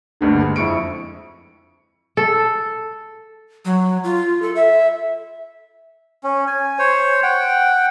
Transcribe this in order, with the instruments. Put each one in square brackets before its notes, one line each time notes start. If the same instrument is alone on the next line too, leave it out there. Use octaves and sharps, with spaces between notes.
[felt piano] F#1 D2 G2 D3
G#3
F2 E4 C#6 C#7 D7
[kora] A4
[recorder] F#3
F4
A4
E5
[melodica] C#4
G#5
C5 C#5
F#5 G5